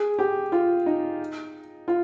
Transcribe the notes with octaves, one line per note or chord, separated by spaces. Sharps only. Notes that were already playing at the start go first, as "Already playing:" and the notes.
Already playing: G#4
G4
F4
D#4
F4